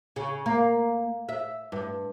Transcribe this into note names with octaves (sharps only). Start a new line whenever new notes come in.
C#3
A#3
E5
G2